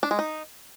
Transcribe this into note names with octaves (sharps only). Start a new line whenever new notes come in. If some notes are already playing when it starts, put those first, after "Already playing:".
D4
G#3
D#4